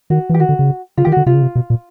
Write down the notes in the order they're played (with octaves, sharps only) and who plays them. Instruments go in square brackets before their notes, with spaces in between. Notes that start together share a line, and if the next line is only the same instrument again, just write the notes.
[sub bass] D#3 [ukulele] F#4
[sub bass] E3
[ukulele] G4
[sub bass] D#3 [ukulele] F#4
[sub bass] D3
C#3
[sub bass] C#3 [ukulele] F4
[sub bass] D#3 [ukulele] G4
[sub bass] D3 [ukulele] F#4
[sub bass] C3 [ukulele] F4
[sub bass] C#3
C3
B2
A#2